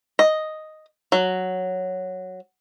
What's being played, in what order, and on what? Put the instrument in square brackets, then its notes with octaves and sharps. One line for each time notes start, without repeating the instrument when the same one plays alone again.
[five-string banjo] D#5
F#3